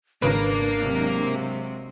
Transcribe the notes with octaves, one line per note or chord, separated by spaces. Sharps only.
G#1 C#3 A#3 D4 A#4 B4
C3 F#3 G#3